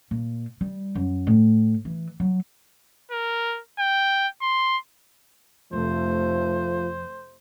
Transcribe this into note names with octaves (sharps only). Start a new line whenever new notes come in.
A#2
G3
F#2
A2
E3
F#3
A#4
G5
C6
F1 F2 C3 F3 A3 C5